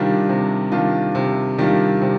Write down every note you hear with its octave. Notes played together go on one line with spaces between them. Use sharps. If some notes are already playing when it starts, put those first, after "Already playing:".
Already playing: C3 D#3 G3 D4 F4
C3
D#3 G3 D4 F4
C3
D#3 G3 D4 F4
C3